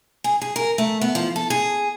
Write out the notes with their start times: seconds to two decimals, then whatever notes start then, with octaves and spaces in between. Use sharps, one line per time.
0.24 G#4
0.42 G#4
0.56 A#4
0.78 A3
1.01 B3
1.15 F3
1.36 A4
1.50 G#4